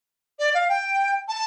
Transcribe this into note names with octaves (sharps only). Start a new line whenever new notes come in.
D5
F5
G5
A5